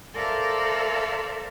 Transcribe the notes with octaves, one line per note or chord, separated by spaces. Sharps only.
A4 A#4 C5 D5 E5 F5